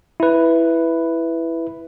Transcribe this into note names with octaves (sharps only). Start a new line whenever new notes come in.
E4 B4